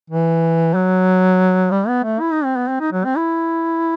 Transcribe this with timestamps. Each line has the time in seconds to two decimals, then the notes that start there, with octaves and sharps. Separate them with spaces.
0.10 E3
0.74 F#3
1.71 G3
1.88 B3
2.04 A3
2.20 E4
2.32 D#4
2.45 C4
2.56 B3
2.68 C4
2.80 D#4
2.92 F#3
3.05 C4
3.17 E4